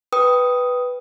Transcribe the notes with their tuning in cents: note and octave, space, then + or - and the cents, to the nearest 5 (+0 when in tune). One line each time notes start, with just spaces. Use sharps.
B4 +0 G5 +0 D#6 +5